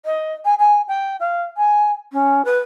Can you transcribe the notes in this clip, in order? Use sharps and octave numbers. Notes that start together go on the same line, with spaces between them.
D#5
G#5
G#5
G5
F5
G#5
C#4
B4